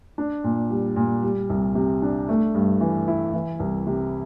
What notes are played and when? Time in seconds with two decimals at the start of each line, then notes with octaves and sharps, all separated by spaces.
0.18 D4
0.44 A#2
0.70 G3
0.96 A#2
1.22 G3
1.50 C2
1.75 C3
2.02 D4
2.29 A3
2.54 G2
2.81 E3
3.08 E4
3.34 E3
3.59 C2
3.87 C3